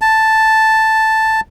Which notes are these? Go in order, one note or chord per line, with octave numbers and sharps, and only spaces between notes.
A5